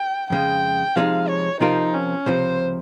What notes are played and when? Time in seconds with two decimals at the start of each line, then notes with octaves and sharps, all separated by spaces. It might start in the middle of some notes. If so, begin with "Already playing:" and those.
Already playing: G5
0.30 F2 C#3 G#3 G5
0.96 C3 F3 G#3 C4 D#4 F5
1.28 C#5
1.61 C3 F3 C4 D#4 F4 A#4
1.94 C#4
2.26 C#2 C3 F3 C5